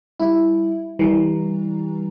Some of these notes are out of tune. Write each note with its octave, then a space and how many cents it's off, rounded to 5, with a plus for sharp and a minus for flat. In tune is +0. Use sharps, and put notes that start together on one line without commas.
G3 +0 E4 +0
E3 -30 G3 +0 A#5 +0